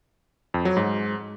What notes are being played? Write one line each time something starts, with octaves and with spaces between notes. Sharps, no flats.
F2
F#3
G#2